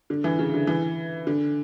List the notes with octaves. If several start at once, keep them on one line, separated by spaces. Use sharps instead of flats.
D3
E3
C#3
D3
E3
D3